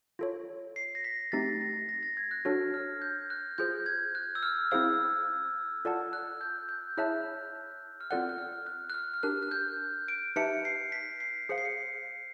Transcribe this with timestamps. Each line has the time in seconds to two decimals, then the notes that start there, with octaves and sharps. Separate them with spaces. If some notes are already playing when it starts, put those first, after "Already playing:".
0.19 F4 A4 C#5
0.76 C7
0.95 A#6
1.04 B6
1.32 A3 C4 D#4 G4 A6
1.61 A#6
1.89 A#6
2.03 A6
2.17 G#6
2.31 F#6
2.45 D4 F#4 A4 C#5 F6
2.74 F6
3.02 G6
3.30 F#6
3.58 F4 G#4 C5 G6
3.86 G#6
4.15 F#6
4.35 E6
4.43 F6
4.71 C4 E4 G#4 C5 F5 E6
5.85 F4 A4 D5 F#5 A5
6.13 F#6
6.41 G6
6.69 G6
6.97 E4 G#4 C#5 E5 A5 F#6
8.01 F6
8.11 C4 F4 A4 D5 F#5 F#6
8.29 F#6
8.38 F6
8.66 F#6
8.90 F#6
8.94 F6
9.14 F6
9.23 D4 G4 A#4 F#6
9.43 F#6
9.51 G6
10.08 D7
10.36 D#4 G4 B4 E5 A5 C#7
10.65 C7
10.92 B6
11.20 C7
11.49 G#4 C5 F5 C#7
11.58 C7
11.65 C#7